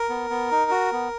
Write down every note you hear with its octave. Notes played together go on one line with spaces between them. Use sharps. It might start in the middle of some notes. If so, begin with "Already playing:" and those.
Already playing: A#4
B3
B3
D#4
F#4
B3